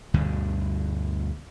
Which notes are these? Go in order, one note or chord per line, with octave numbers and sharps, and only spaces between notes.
D2 G2 B2 D3